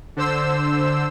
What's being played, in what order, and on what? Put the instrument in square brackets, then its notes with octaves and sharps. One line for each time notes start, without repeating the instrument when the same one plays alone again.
[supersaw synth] D3 C5 E6